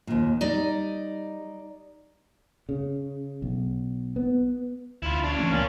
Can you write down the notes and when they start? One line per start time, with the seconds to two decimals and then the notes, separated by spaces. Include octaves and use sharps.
0.07 D#2 A#2
0.41 G3 D#4 D5 D#5
2.69 C#3
3.42 B1
4.16 B3
5.02 D2 E4 F4
5.23 D4 C#5
5.36 E3 A3 C#4
5.51 C#2 A#3 C#4 D5